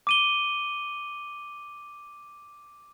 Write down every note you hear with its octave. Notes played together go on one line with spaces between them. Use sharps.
D6 D#7 G7